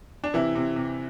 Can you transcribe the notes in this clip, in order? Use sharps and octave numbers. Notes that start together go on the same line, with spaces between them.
D4
C3 E3 E4
C3
C3